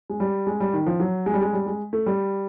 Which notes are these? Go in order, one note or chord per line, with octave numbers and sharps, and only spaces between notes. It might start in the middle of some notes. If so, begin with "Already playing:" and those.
G#3
G3
G#3
G3
D#3
F3
F#3
G#3
G3
G#3
G3
G#3
A3
G3